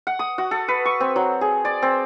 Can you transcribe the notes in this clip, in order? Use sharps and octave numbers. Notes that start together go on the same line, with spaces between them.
F#5
D#6
F#4
A4
B4
C#6
C4
F#3
G#4
D5
C4